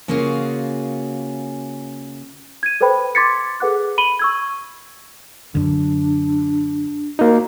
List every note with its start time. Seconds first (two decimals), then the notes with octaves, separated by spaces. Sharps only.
0.08 C#3 A#3 C#4 F4 F#4 G#4
2.63 G#6 D#7
2.81 A4 B4 C5 G5 B5
3.15 C6 D6 G#6 A6 B6 C#7
3.60 G#4 A4 B4 F#5 D6 F#6
3.98 B5 D#7 F#7 G7
4.19 C#6 E6 G#6
5.55 F#2 D3 D4
7.19 A#3 D#4 F#4